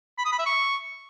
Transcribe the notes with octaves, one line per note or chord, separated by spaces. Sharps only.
B5
D#6
B5
E5
C#6